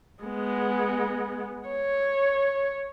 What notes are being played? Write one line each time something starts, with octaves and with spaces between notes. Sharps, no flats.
G#3 B3
C#5